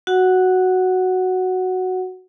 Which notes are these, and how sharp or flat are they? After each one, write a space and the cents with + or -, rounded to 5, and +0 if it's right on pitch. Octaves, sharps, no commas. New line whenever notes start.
F#4 +0 F#5 +0